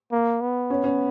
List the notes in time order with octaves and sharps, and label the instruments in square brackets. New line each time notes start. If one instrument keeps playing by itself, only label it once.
[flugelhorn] A#3
B3
[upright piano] C#4
C#4